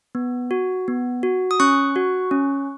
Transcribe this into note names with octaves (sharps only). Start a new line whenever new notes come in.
B3
F#4
B3
F#4
D#6
C#4 C#6 F#6
F#4
C#4